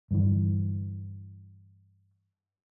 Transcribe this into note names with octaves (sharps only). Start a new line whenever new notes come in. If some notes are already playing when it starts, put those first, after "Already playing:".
G2 D3 E3